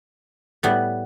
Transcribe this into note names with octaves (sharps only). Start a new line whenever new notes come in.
A2 G3 B3